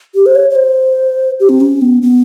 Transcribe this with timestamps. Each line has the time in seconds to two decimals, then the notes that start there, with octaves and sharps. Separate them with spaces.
0.15 G4
0.26 C5
0.35 C#5
0.50 C#5
0.55 C5
1.40 G4
1.49 C4
1.61 C#4
1.81 B3
2.02 B3